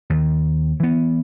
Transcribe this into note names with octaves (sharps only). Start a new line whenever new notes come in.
D#2
E3 B3